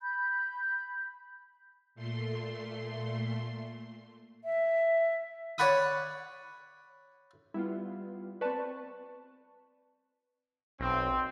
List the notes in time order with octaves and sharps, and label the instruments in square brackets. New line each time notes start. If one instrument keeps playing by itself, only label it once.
[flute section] B5 G6
[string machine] A#2 A3 C6
[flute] E5
[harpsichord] C#5 D5 F#5 B5 D#6
[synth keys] G3 B3 F4 [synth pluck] E4
[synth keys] C4 C#6 [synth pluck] B4 D5 A5
[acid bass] B1 [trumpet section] C4